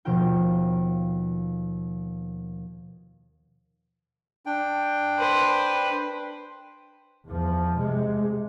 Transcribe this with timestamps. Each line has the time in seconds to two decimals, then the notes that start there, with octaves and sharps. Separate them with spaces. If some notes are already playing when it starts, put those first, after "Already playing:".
0.05 D#2 B2 F3 F4 G5 G6
4.46 D4 G5
5.18 B4 C5
7.27 E2 F3
7.77 C3 G#3